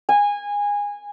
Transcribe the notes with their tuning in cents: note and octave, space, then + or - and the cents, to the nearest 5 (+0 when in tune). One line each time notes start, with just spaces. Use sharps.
G#5 -20